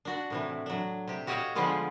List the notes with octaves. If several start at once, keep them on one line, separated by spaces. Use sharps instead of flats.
D4 F#4
A2 C3 E3
F#3 D4
C3 G4
F#4 G4 C#5 D#5 F5
D3 F3 G3 G#3 B3 F4